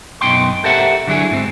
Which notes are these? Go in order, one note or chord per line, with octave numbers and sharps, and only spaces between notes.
F#2 B2 D#4 G5 C6
G4 A4 A#4 C5 E5 F#5
D3 F#3 E4 G#4
G#2 C4